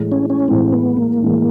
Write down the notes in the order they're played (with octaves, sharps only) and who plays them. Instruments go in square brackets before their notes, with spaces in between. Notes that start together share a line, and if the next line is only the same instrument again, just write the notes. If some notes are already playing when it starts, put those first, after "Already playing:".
Already playing: [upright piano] A2 E3 G#3
[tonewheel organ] C#4
C#4
[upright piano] A2 E3 G#3 [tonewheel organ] C4
[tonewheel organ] B3
A#3
[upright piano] A2 E3 G#3